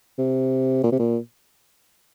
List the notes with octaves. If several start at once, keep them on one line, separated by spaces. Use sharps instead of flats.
C3
A#2
C3
A#2